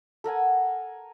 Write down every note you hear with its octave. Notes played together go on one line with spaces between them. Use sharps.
A4 A#4 F#5 G#5